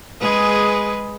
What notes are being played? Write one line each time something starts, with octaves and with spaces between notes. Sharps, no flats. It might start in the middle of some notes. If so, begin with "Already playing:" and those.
G#3 G#4 B4